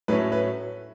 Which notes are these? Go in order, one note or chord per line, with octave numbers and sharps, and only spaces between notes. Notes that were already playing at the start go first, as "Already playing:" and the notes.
A2 F#3 A3 C#4 B4
B4